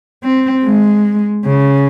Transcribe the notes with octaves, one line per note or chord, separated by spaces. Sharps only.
C4
G#3
C#3